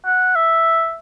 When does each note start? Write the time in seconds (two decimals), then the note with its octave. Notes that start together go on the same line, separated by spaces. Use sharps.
0.06 F#5
0.36 E5